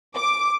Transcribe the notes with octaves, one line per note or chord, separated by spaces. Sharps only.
D6